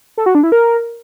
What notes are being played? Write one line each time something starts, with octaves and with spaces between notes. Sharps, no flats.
A4
F#4
D4
E4
A#4